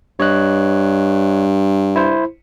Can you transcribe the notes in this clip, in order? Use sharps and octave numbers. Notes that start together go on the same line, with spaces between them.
G2 C#5 D#5 F#6
E4 C5